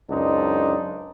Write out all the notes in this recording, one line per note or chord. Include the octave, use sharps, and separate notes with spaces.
C#2 F#2 D4 D#4 C5